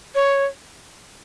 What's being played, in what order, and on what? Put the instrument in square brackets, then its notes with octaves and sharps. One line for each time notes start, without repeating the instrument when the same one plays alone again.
[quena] C#5